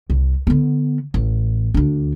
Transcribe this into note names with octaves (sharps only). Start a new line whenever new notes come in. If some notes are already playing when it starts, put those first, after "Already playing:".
C2
D3 B3
A1
D2 D4